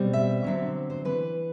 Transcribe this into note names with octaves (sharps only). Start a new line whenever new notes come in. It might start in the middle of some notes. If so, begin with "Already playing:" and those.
Already playing: B2 G3 C4
E5
D3 F#3 C4
C5
E3 B4